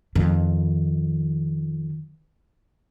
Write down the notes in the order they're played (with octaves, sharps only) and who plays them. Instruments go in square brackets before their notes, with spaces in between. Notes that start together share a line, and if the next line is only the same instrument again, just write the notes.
[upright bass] F2 D#3